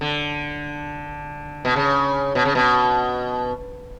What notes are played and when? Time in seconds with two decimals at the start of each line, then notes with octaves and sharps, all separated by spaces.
0.01 D3
1.65 B2
1.76 C#3
2.35 B2
2.45 C#3
2.55 B2